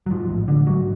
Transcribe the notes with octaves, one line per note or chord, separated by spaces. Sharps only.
F#3
G#2 F3
A1
A1 D3
G#2 F#3